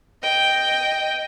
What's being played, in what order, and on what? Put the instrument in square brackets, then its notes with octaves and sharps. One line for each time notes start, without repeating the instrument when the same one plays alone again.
[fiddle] D#5 G5